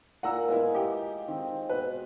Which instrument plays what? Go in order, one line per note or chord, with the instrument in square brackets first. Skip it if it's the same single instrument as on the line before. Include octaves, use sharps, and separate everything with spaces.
[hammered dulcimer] A#2 [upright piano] F#5 A#5 E6
[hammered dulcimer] G#3 [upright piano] B3 E4
[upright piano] G4 G5
[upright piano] D#3 [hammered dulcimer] C4
[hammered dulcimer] B2 [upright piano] B4